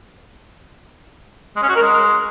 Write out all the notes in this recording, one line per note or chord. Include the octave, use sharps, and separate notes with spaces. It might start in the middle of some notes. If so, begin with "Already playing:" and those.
G#3
C#4
F#4
A#4
G#3